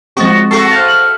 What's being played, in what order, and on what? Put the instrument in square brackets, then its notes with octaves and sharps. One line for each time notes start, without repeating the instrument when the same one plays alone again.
[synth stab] F3 G#3 C4 [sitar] F#4 [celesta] C#6 D#6 A6
[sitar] A3 F#4 A4 [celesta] C#6 A6 C7
[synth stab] C5 F5 [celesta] F6 A6
[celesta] F6 F#7